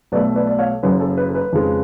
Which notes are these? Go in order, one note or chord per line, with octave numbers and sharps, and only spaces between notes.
B1 B2 A3 B4 D5
B4 D5
D5
C#5 F5
F#1 F#2 C#3 B4
A4
B4
A4
B4
F2 C#3 G#3